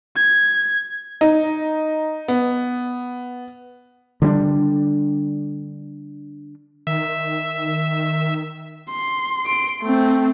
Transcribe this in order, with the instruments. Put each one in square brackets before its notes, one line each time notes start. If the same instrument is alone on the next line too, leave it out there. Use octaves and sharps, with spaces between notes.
[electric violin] G#6
[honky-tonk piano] D#4
B3
[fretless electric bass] D3 G3 C4 D4
[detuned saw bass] D#3 [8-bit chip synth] E5
[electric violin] C6
C6 D7
A3 C4